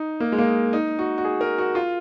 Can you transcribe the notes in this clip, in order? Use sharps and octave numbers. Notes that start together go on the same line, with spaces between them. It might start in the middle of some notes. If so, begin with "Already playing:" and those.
Already playing: D#4
A#3
G#3
A#3
D#4
F#4
F#4
G#4
A#4
F#4
F4